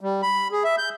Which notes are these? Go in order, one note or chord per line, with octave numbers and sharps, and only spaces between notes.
G3
B5
G#4
E5
G6